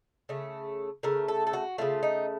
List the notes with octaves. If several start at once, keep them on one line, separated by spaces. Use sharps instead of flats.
C#3 A3
C#3 A3 A#4
A4
A4
F#4
C#3 A3 F4
D#4